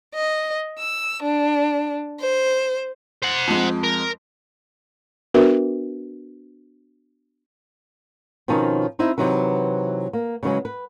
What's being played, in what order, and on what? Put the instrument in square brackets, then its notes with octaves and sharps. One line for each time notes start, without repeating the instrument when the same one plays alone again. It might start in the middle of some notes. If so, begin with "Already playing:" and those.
[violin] D#5
E6
D4
C5
[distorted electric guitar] C5 F#5
[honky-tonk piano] F2 F3 G#3
[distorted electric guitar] A#4
[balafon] B3 D4 F#4 A#4 B4 E5
[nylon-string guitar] B2 D#3 F3 C4 C#4 D#4
C4 D#4 E4 E5
C3 E3 F#3 D#4 B4
A#3
C#3 E3 F#3 G#3
B4